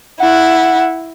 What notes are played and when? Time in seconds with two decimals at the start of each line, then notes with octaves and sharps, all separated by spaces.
0.20 E4 F#5